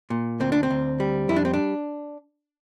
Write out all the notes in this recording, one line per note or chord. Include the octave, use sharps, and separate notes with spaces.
A#2
D2 C4
D4
C4
D2
G3
F2 E4
D4
C4
D4